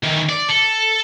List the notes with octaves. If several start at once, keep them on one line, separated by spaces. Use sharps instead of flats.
D#3 E3
D5
A4